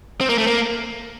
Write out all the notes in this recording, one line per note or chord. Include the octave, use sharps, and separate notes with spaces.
C4
A#3
A3
A#3